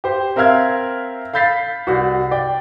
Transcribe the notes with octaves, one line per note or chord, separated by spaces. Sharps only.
G4 C5
C4 A#4 E5 F5 F6 G#6
F5 B5 G6 A6 B6 C7
C2 F#4
D5 G5